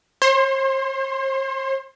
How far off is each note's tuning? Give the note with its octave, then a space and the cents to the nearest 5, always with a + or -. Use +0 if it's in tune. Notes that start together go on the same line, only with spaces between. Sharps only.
C5 +45 C6 +0